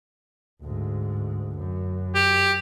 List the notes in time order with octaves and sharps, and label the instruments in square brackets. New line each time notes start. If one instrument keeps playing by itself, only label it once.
[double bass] D2 G#2
F#2
[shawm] G4